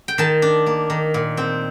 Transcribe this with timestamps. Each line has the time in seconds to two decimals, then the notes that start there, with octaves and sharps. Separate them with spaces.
0.08 G5
0.18 D#3 A5
0.42 D4
0.66 A#3
0.90 D#3
1.14 A#2
1.37 C4